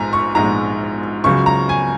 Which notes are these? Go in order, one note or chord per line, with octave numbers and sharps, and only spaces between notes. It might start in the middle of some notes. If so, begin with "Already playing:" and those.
Already playing: A#1 G#2 G#3 G#5 A#5
C#6
A#1 G#2 G#3 A#5
C#2 C#3 F#3 C#6
A#5
G#5